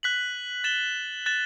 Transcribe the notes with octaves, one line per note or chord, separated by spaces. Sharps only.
F#6 B6 F#7
A6 E7 G7
F#6 A6 E7